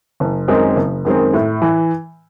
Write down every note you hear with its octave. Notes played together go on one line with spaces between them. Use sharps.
F#1
F#2 D#3 G#3 C4
F#1
F#2 D#3 G#3 C4
A2
E3